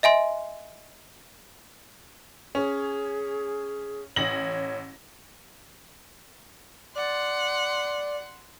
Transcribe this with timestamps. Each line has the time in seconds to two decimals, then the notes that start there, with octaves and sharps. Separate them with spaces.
0.03 D#5 E5 G#5 C6
2.55 C#4 G#4
4.16 A1 C#5 A#6 F#7
6.96 D5 F#5 C6